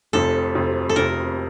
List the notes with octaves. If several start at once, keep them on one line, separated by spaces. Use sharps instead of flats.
F1 F2 C3 A4
F1 F2 C3
A4
F1 F2 C3 A#4